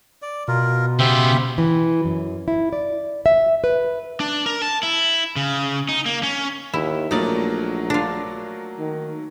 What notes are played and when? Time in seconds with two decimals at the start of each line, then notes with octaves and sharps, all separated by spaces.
0.22 D5
0.48 B2 F4 A#4
0.99 C#3 B3 G4 C5 E5
1.58 E3
2.05 F#2
2.48 E4
2.73 D5
3.26 E5
3.64 B4
4.20 D4
4.46 A#4
4.62 A5
4.83 E4
5.36 C#3
5.89 D#4
6.06 A#3
6.23 C#4
6.74 D#2 E4 E7
7.11 A#1 F#3 A3 A#3 D#4 D5
7.90 D4 F4
8.79 D#3